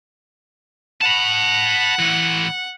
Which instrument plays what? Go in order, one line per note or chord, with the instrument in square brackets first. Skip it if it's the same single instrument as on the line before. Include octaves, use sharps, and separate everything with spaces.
[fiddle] F#5 [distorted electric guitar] A5 B5
[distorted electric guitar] A2 E3